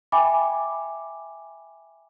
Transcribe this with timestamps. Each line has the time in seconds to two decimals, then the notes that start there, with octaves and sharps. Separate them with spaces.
0.12 E5 G5 G#5 B5 D6